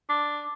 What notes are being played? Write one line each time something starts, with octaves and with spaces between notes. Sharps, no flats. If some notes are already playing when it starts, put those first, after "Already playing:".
D4